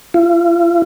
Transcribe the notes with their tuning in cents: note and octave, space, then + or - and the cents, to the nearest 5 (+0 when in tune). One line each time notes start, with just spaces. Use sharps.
F4 -40